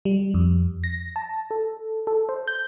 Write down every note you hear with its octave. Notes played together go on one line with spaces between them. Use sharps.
G3
F2
A#6
A5
A4
A4
C5
G6